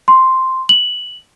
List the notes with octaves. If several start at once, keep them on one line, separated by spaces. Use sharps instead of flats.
C6
F#7